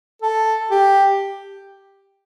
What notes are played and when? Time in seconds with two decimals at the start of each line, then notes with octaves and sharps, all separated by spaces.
0.22 A4
0.71 G4